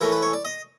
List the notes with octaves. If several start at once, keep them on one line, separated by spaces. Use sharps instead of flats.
E3 A3 C#4 A#4
B4
C#5
D5
D#5